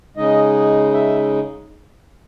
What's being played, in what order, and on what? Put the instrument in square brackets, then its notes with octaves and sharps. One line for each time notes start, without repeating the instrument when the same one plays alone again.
[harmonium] C#3 G#3 D#4 D#5
E5